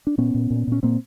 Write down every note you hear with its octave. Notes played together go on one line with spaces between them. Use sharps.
D4
A#2 B3 C#4
A#2
A#2
A#2 C#4
A#2 A#3 C4